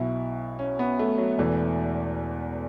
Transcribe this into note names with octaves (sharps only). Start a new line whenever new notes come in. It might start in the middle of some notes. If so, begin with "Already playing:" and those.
Already playing: B1 B2 E4
C#4
B3
A3
F#3
E1 E2 E3 A3